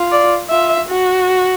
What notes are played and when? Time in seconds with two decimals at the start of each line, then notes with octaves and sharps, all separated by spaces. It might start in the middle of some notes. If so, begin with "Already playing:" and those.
Already playing: F4
0.12 D5
0.50 F4 E5
0.88 F#4